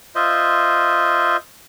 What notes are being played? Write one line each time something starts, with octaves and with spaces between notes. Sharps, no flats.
F4 C5 D#5 E5